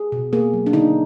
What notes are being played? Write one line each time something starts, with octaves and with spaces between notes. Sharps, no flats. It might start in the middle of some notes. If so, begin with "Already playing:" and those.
Already playing: G#4
B2
A#3 G#4
F#3
D4
D3 D#4